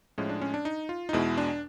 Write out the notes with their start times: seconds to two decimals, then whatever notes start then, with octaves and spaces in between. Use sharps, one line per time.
0.18 A2 F3 G#3 C#4
0.29 D4
0.42 C#4
0.54 D4
0.65 D#4
0.89 F4
1.09 D#4
1.13 E2 B2 G#3 E4
1.37 D4